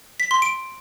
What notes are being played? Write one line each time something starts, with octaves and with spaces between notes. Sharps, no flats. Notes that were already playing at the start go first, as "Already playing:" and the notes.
B6
C6
D7